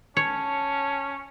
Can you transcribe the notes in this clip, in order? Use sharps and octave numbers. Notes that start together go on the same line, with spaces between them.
C#4 C#5 A5